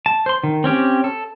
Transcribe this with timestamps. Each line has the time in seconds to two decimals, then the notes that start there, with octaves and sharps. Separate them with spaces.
0.06 A5
0.26 C5 C6
0.44 D#3
0.64 C4 C#4 G4
1.04 A4